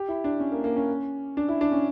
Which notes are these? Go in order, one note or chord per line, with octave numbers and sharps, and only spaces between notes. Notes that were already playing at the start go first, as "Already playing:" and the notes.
Already playing: G4
E4
D4
C#4
A#3
A#3
C#4
D4
E4
D4
C#4